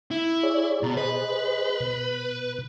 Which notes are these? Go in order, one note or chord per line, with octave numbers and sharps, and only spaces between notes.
E4
G#4 C#5 D5
B2 A#5 A6
G#4 B4 C5 D#5
B2 F#6